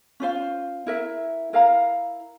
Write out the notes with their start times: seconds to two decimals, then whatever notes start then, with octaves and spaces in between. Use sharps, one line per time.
0.20 C#4 F4 C5 F5
0.87 E4 A#4 E5
1.53 E4 A#4 F5 A#5